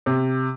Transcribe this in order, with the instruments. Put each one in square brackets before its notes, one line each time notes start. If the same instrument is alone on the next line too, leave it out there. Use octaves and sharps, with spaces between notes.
[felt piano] C3